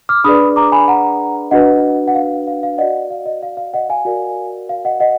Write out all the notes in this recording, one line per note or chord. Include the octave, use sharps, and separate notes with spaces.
D6 F6
D4 G#4 B4 D5 B5 D#6
A#5 D6
G#5 B5
F#5 A#5
D4 F#4 B4 D#5 F#5
F#5
F5
F5
F5
F#4 D5 D#5 F#5
F5
D#5
F5
F5
D#5 F#5
F5 G#5
F#4 A#4 D5
F5
D#5 F#5
D#5 F#5